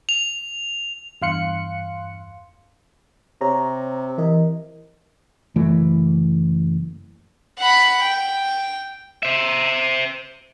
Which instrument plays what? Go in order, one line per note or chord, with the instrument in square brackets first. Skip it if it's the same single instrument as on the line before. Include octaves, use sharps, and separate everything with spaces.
[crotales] F7
[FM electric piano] E2 G2 F5 C6 F#6 C#7
[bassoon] C3 [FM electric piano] C#5 A#5
[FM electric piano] E3 A#4 D#5
[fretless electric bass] F#1 E3 A3
[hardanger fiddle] F#5 B5
G5
[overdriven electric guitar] C5 E5